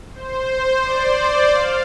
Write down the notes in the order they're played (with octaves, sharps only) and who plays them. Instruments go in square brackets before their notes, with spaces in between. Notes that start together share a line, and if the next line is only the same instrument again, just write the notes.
[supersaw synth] C5
D5
F5